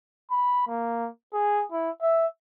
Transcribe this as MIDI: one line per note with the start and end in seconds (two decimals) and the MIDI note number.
0.32 0.64 83
0.68 1.09 58
1.33 1.65 68
1.72 1.90 64
2.02 2.26 76